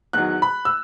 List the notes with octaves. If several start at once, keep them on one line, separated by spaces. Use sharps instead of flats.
E2 D#3 F#3 F#6
B5
E6